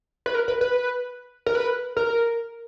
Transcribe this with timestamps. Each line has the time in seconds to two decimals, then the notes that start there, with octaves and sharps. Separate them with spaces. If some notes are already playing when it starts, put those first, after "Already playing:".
0.26 B4
0.35 A#4
0.48 B4
0.61 B4
1.46 A#4
1.55 B4
1.97 A#4